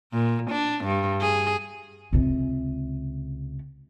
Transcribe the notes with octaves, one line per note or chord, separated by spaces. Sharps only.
A#2
D4
G2
G#4
C#2 C3